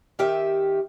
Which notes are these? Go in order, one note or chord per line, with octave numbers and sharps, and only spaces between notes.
D#3 G4 E5